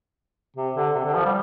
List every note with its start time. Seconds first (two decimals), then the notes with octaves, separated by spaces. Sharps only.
0.56 C3
0.76 D3
0.95 C3
1.05 D3
1.15 F3
1.25 G3